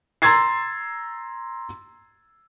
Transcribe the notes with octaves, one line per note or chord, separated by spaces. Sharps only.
A#5 C6 E6 G#6 A6 C7